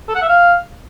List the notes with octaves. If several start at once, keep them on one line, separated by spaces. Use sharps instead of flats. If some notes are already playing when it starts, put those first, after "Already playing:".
A4
F#5
E5
F5